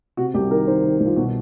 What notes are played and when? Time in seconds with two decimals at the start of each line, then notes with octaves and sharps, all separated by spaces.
0.17 C3 F#4
0.34 C2 G4
0.51 D#3 A#4
0.67 D#3 C5
0.84 D#3
1.00 C2
1.06 F4
1.16 B2 F#4